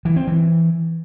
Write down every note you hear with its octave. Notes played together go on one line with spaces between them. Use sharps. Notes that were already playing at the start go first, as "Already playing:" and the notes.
E3
C4
E3